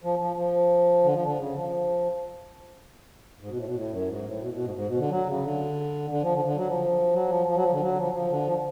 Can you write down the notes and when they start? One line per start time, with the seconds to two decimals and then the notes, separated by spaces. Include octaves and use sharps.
0.03 F3
0.19 F3
0.36 F3
1.04 D3
1.14 F3
1.24 D3
1.37 C#3
1.55 F3
3.41 G#2
3.49 B2
3.57 A2
3.67 B2
3.75 A2
3.91 F#2
4.08 G#2
4.25 A2
4.41 B2
4.53 B2
4.64 G#2
4.75 G#2
4.87 B2
4.98 D3
5.10 F#3
5.26 C#3
5.43 D3
6.10 D3
6.22 F3
6.34 D3
6.45 D3
6.56 F#3
6.67 F3
7.13 F#3
7.29 F3
7.47 F3
7.55 F#3
7.63 F3
7.72 D3
7.80 F#3
7.92 D3
7.97 F3
8.13 F3
8.30 D3
8.47 F3